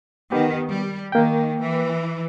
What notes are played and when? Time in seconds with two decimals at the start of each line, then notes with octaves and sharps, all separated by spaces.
0.32 D#3 B3 G4
0.67 G3
1.12 D#3 A#3 G5
1.60 E3